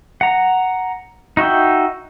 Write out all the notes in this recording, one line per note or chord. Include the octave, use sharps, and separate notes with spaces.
F#5 A#5
D#4 F#4 E5 G5